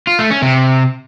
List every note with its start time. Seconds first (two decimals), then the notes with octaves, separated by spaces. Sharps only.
0.07 F4
0.19 A3
0.30 C#4
0.42 C3